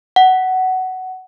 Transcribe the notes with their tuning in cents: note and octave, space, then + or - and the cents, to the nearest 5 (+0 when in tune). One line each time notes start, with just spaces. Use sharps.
F#5 +15